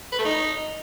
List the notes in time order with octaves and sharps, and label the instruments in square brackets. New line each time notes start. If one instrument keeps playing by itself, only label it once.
[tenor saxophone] B4
A3
D#4